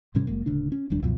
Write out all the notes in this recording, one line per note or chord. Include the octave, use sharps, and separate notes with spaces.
G#2 C3 G3 C#4
F#1 F#2 G#3 A#3
D1 D2 C#3 D4
C#4
E1 D#2 G3 D4
C#2 F#2 B2 F3